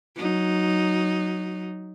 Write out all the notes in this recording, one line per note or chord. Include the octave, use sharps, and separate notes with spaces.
F#3 D#4